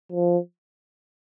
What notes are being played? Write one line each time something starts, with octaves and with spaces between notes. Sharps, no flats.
F3